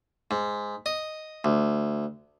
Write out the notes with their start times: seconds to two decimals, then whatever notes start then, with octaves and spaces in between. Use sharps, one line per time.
0.31 G#2
0.86 D#5
1.44 D2